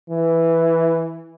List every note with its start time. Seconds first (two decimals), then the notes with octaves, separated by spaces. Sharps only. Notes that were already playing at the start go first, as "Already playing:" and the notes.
0.10 E3